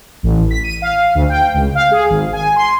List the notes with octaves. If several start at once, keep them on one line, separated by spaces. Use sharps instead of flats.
A1
B6
D#7
F5
D2
G5
C#2
F5
G#4
G#1
G#5
C6